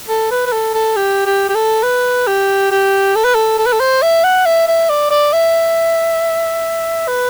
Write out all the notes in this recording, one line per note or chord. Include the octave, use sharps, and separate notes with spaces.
A4
B4
B4
A4
A4
G4
G4
G4
A4
B4
G4
G4
A4
B4
A4
A4
B4
A4
C5
E5
F#5
E5
E5
D5
D5
E5
B4